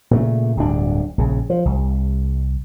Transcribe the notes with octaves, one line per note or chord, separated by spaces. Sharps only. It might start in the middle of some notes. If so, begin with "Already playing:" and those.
A#2 C#3 A3
D1 D2 G2 D4
A#1 C#3
F3
C2